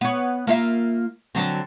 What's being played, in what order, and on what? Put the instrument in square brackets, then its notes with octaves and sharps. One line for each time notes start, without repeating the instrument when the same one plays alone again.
[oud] B3 C#5
A#3 F4 E5
D3 F#3 C4